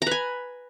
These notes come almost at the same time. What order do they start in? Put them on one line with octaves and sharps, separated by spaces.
A#5 B4 G#5